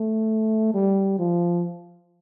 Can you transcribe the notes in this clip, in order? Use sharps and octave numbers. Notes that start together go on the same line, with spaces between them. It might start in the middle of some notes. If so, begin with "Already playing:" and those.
Already playing: A3
G3
F3